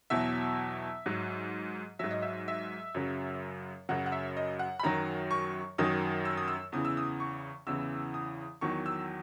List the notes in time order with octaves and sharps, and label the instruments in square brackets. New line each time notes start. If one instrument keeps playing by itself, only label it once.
[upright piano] E2 B2 F#3 E5
G#2 F#3
G#2 F#3 E5
D#5
E5
E5
F#2 C#3 F#3
F#2 C#3 F#3 F#5
F#5
E5
D#5
F#5
B5
F#2 D#3 F#3 A#5
C#6
F#2 D#3 F#3 D#6
E6
D#6
E6
E2 C#3 E3 D#6
E6
D#6
C#6
E2 C#3 E3 E6
D#6
E2 D#3 F#3 C#6
E6